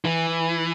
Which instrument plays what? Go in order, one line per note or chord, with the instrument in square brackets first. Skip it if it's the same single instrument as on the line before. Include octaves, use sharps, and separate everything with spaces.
[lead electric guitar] E3